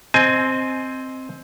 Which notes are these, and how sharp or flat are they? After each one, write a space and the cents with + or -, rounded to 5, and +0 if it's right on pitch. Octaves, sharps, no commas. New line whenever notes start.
C4 +0 D#5 +0 G#5 +20